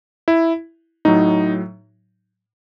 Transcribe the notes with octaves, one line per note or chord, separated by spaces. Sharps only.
E4
A2 F#3 D#4